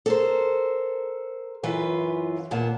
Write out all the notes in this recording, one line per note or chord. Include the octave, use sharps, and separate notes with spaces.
A4 A#4 C5
F#2 E3 F4 B4
D#2 A#2 B3 A5